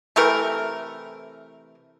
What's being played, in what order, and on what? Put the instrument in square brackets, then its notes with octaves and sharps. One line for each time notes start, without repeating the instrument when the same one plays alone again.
[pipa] C3 E3 A3 A#4